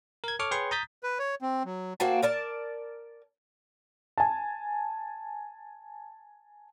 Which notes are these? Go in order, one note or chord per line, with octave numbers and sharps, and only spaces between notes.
A#4 G#6
A4 C#5 C#6 D6 F6
G#4 B4 C#5 G5 C6 C#6
A#5 D#6 G6 A6 B6
B4
C#5
C4
F#3
A#3 C4 F#4 A5
A#4 D5 A5
G#5 A5